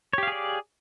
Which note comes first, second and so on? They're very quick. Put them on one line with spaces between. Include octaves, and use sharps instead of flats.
C#5 G4 F5 G#4 D5